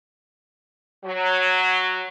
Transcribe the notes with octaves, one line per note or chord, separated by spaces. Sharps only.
F#3